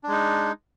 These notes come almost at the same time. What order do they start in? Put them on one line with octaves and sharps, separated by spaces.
D4 G#3 D#4